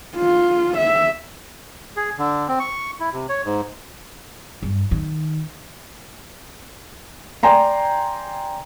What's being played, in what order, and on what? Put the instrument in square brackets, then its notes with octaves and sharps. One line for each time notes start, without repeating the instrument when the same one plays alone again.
[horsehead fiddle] F4
E5
[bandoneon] G#4
D3
C4
C#6
E4
C3
C#5
G#2
[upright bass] G2
D#3
[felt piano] D5 G5 G#5 A#5 C6